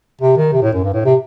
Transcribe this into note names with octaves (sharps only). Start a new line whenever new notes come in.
C3
D#3
C3
A2
F#2
G2
A2
C3